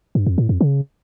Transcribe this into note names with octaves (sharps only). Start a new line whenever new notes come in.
G2
F2
A2
F2
C#3